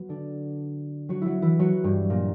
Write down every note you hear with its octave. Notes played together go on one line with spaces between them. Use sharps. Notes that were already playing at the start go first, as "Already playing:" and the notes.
Already playing: F#3 B3 F#4
D3 D4
F#3 F#4
F#3 E4 F#4
E3 E4
F#3 F#4
G2 G3
A#2 A#3